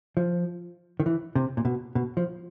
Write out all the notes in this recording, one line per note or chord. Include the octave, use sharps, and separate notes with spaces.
F3
D#3
E3
C3
A#2
B2
B2
F3